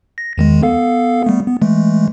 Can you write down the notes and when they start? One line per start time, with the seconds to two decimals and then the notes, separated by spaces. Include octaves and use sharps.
0.18 A#6
0.38 E2 D#3 G#3
0.62 B3 A4 F5
1.24 G3 A3 B3
1.47 B3
1.62 E3 G#3 A3